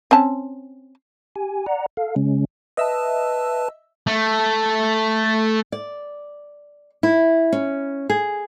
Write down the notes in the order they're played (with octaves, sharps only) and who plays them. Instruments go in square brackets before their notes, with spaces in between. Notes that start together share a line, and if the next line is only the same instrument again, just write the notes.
[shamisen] C4 C#4 A5
[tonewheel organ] G4 G#5
D5 F#5 A#5
A4 F5
C#3 G#3 C#4
[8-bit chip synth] B4 A5 [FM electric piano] D#5 E5 E6
[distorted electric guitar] A3
[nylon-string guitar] D5
E4
C#4
G#4